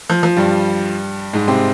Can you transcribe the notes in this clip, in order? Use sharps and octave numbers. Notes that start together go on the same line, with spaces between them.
F3
F3
G2 G3
G#2 G#3
C3 C4